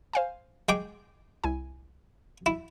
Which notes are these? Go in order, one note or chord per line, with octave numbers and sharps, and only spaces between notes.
C5 F5 G#5
G#3 G5 D6
C2 E4 G#5
E4